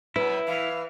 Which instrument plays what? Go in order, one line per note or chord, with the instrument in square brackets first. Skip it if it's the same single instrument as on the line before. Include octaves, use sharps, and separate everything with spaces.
[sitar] F#2 [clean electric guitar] E4 [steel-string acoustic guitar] B4
[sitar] E3 [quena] F5